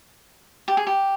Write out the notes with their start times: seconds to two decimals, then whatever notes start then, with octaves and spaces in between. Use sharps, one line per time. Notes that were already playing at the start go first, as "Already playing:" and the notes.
0.68 G4
0.77 G#4
0.87 G4